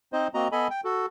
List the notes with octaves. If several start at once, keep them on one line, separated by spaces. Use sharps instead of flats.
C4 D#4 C5 D#5
A#3 C4 F#4 D#5 A#5
B3 A4 D#5 G#5 B5
G5
F#4 A4